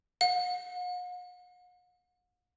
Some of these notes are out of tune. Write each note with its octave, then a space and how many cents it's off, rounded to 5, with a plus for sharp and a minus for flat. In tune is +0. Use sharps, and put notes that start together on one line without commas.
F#5 -45